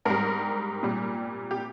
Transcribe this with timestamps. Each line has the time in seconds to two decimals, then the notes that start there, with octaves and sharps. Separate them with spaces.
0.05 G#2 G3 A#4
0.83 A#2 G3
1.51 G4